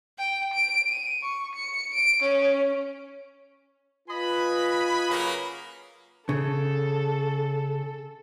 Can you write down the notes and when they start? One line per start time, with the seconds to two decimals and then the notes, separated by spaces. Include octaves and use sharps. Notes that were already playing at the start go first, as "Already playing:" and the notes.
0.18 G5
0.54 D7
0.89 D#7
1.23 C#6
1.55 C#7
1.94 D7
2.22 C#4
4.09 F4 B4 D#5 G#5 B5
5.10 C#3 F#3 A#3
6.29 C#3 A4